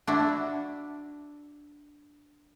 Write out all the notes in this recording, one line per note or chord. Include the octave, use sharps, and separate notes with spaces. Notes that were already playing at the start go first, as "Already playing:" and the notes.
D4 E4 F#4